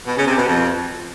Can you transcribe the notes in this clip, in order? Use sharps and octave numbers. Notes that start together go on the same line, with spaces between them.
B2
C#3
C3
B2
F2